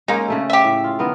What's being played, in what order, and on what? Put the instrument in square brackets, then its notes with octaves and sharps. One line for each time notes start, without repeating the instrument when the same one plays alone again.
[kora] G#3 C#4 [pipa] A#3 D#4
[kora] C#3 A3 A4
[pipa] G4 E5
[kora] A2
F4
D#3 B3 A#4